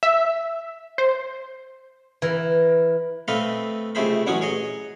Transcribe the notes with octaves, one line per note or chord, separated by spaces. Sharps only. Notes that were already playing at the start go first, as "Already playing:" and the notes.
E5
C5
E3 A#4
A3 C4 A4 B4 D#5 F5
C#2 C3 A3 G#4 C5 B5
A1 F#3 C#4 F#5 G#5 D#6
G#4 C#5 D#5